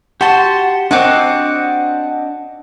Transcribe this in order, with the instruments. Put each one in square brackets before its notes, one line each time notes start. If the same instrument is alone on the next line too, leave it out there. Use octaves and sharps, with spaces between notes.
[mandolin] F#4 A5 [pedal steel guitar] G4 C6
[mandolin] C4 F#4 F#5 [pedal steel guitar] D4 D#5 D6